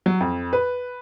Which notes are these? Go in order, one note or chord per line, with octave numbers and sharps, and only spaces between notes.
F#3
F2
B4